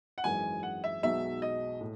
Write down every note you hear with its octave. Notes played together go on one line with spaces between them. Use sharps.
F#5
G#1 F#2 E3 G#3 G#5
F#5
E5
B1 B2 G#3 D#4 F#4 E5
D#5
A2